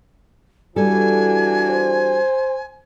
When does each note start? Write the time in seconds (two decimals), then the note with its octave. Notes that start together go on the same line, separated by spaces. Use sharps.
0.76 E3 G3 D4 F#4 A4 G#5
1.70 C5